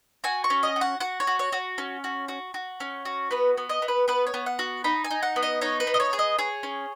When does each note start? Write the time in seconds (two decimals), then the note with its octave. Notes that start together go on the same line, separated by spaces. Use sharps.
0.24 F#4 G#5
0.44 C#6
0.50 C#4
0.63 D#5
0.76 F#4
0.81 F#5
1.00 F#4 F#5
1.20 C#5
1.27 F#4
1.39 C#5
1.52 F#4
1.78 C#4
2.04 F#4
2.28 F#4
2.54 F#4
2.80 C#4
3.05 F#4
3.31 B3 B4
3.57 B3
3.69 D#5
3.82 B3
3.88 B4
4.08 B3 B4
4.27 C#5
4.34 B3
4.46 F#5
4.59 F#4
4.84 D#4 B5
5.04 G#5
5.10 D#4
5.23 F#5
5.36 B3
5.43 D#5
5.61 D#4 C#5
5.80 B4
5.87 B3
5.94 D#5
6.00 C#5
6.13 G#4
6.19 D#5
6.39 G#4 C#5
6.63 C#4